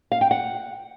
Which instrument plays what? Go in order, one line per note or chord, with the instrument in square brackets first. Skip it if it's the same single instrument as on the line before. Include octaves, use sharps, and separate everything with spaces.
[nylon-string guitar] F5
G5
F#5